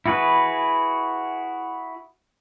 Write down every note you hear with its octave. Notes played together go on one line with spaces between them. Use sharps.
E4 F#4 G#4 B4